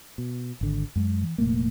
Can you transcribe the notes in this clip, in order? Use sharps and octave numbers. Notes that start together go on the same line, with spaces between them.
B2
G#1 D3
F#2 G#3
E3
F1 A#2 A3 A#3